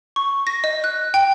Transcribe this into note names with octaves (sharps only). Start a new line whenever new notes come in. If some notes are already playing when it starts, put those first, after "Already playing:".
C#6
A#6
D#5
F#6
G5